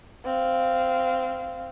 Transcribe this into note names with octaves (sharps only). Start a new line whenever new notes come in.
C4 F5